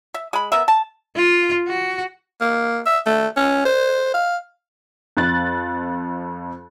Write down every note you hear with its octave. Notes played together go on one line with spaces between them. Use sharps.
E5
G#3 B5
B3 A#4 E5
A5
F4
F#4
A#3
E5
A3
C#4
C5
F5
F2 F#6 A6